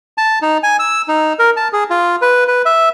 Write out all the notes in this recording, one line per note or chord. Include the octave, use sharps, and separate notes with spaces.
A5
D#4
G#5
E6
D#4
A#4
A5
G#4
F4
B4
B4
E5